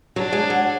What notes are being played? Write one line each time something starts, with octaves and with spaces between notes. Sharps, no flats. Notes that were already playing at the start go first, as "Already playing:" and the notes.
F#3 D4
G#3
F#3